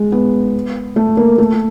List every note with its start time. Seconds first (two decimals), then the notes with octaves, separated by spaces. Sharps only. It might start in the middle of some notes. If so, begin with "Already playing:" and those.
Already playing: G#3
0.12 B3
0.96 A3
1.17 A#3
1.38 A3